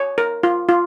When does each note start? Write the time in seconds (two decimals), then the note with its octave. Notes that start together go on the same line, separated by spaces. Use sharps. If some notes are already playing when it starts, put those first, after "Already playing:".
Already playing: C#5
0.18 A#4
0.43 F4
0.69 F4